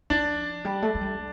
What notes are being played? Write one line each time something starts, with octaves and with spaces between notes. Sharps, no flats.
F3 D4 D5
G3
A3
A3
G3